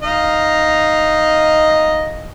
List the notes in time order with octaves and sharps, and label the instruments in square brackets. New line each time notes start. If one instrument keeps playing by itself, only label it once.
[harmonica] D#4 D#5 F5